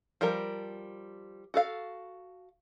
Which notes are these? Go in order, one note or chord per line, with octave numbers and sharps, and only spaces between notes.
F3 G3 A#4
F#4 A4 F5